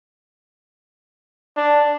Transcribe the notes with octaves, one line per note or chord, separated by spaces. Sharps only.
D4